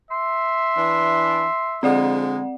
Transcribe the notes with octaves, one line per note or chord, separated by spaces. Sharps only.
E5 C6
E3 D4
D3 F3 G#3 C4 D5 F#5